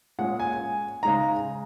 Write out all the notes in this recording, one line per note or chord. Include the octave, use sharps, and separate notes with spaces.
A#2 G#3 C#4 F#5
G#5
C#3 G#3 D#4 A#5